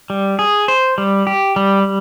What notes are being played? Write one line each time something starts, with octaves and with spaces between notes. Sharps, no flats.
G3
G#4
C5
G3
G4
G3